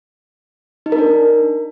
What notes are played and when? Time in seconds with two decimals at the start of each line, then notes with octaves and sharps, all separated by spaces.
0.86 D#4
0.92 A#4
0.98 D4